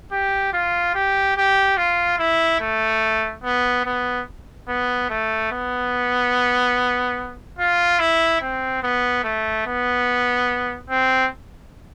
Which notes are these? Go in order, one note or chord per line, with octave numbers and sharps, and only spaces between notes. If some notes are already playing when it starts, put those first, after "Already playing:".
G4
F4
G4
G4
F4
E4
A3
B3
B3
B3
A3
B3
F4
E4
C4
B3
A3
B3
C4